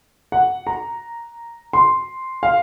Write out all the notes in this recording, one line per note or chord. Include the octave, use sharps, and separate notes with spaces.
F#5
A#5
C6
F5